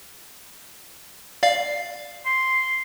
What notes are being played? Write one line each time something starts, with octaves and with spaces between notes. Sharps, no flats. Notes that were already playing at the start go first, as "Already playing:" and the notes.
D5 F5
C6